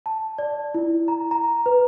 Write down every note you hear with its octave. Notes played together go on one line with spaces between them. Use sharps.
A5
D5
E4
A#5
A#5
B4